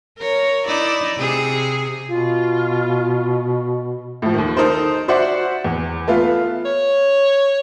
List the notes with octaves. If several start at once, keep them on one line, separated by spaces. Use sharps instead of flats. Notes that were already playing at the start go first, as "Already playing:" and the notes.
A#4 C#5
D#4 E4 D5
C3 G#4
B2 F4
A2 F3
D#2 D#3
D#4 A4 A#4 C5
F#4 C5 D5 E5 F#5
E2
A3 B3 F4
C#5